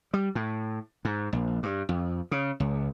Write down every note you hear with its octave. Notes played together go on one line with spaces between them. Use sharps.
G3
A2
G#2
A#1
G2
F2
C#3
C#2